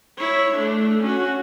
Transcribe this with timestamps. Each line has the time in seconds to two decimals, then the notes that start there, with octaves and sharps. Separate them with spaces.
0.18 E4 C#5
0.56 A3 D4
1.03 C#4 F#4